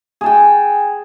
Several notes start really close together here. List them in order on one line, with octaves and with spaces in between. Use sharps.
G#4 A5 G5